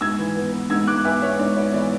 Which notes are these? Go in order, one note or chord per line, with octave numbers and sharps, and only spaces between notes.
G#2 E6 G#6
E3
B3
B3
G#2 E6 G#6
G#2 D6 F#6
B3 E5 G#5
B3 C#5 E5
G#2 D5
B3 C#5
E3 D5